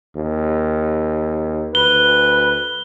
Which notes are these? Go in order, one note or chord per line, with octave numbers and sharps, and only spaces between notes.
D#2
D2 B4 G7